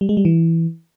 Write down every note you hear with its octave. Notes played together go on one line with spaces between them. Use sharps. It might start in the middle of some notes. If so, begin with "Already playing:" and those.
G3
G#3
G3
E3